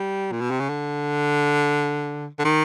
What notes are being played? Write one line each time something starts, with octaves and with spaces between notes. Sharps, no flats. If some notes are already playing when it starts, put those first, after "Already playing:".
Already playing: G3
A#2
B2
C3
C#3
D3
D3
D#3